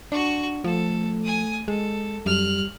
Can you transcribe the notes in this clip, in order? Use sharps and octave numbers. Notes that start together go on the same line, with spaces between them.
D4 F#4 C#6
F3 A3 A4
G#5 D#6
G#3 A4
F#2 G3 F6 F#6